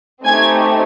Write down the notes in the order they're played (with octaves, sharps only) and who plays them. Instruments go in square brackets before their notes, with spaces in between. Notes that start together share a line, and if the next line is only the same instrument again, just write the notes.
[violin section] A3 C4 D#4 G4 G#5 G#6